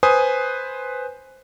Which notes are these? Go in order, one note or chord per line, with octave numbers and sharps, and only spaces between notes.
B4 C5 G#5 D#6